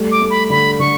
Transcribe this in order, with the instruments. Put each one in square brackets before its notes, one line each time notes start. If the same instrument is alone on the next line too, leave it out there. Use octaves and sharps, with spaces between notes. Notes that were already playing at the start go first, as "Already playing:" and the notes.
Already playing: [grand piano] G3 A3
[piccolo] D6
[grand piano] A3
[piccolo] B5
[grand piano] D3 [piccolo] B5
[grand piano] D3 [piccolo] C#6